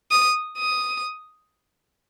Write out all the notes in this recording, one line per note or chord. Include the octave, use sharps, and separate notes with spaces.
D#6
D#6